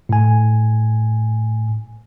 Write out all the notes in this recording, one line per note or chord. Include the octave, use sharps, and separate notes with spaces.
A2 G#5